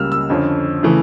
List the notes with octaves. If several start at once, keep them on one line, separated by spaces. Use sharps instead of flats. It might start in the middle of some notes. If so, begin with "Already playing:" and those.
Already playing: C#2 C#3 G3 A#3 E6 F6
E6
F2 D3 F3 C#4
C#3 E3 A3